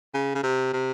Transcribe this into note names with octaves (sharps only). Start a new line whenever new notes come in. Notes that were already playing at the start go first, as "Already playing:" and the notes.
C#3
C#3
C3
C3